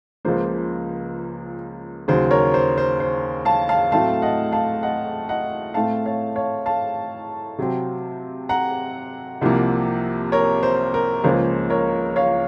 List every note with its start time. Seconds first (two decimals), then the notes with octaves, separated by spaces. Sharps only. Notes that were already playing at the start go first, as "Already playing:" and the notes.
0.25 C#2 C#3 F3 A#3 C5
2.08 D#2 C#3 F#3 C5
2.31 A#4 C#5
2.54 C5
2.78 C5
3.00 C5
3.45 F5 A5
3.69 F5 A5
3.92 A2 F#3 A3 C4 F5 A5
4.22 D#5 F#5
4.52 F5 A5
4.83 D#5 F#5
5.29 D#5 F#5
5.74 A2 A3 C4 F5 A5
6.06 C#5 F5
6.36 C#5 F5
6.66 F5 A5
7.58 C3 F#3 C4
8.49 F#5 A#5
9.41 C2 C3 F3 A#3
10.32 A#4 C#5
10.63 C5
10.94 A#4
11.24 C#2 C#3 F3 A#3 C#4 C5
11.70 A#4 C#5
12.16 C#5 F5